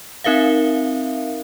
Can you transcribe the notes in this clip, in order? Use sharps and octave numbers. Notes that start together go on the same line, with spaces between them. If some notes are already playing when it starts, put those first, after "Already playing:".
C4 D#4 A#4 E5 F5